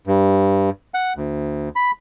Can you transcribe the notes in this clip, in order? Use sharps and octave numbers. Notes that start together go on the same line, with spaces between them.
G2
F#5
D2
B5